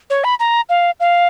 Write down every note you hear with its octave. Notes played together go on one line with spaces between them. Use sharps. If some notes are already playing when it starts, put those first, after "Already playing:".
C#5
B5
A#5
F5
F5